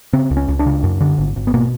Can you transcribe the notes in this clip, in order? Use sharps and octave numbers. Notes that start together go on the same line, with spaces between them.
C#3 C4
C#2
C#4
C#2
D4
C#3
F#2
D3
G#1
G#1
B3
B2 A#3